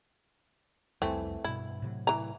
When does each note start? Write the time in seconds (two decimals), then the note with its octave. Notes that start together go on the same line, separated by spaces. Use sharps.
1.02 C2 F2 E3 G3 A3 C4
1.44 G2 B2 E4
1.82 A2 C3 F#3
2.07 E3 A#5